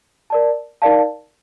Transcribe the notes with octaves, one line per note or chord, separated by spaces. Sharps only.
A#4 D5 A5
D#4 A#4 D5 F5 A5